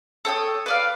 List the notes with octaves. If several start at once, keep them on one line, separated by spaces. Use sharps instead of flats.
A4 C#5 G5 D#6
B4 D5 F5